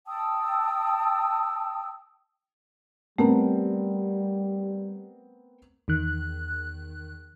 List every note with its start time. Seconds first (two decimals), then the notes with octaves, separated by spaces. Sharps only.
0.07 G5 A5 D#6 E6
3.19 G3 A3 B3 C4 A#4
5.88 E2 D#3 F#6